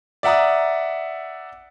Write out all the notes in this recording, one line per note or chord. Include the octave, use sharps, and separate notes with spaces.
D5 E5 F#5 A#5 D#6